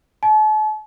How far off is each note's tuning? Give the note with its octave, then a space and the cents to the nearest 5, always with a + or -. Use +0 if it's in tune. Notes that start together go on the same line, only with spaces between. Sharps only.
A5 -40